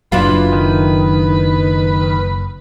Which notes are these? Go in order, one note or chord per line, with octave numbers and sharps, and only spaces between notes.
F#1 F#3 D4 E4 F4 B4
D#3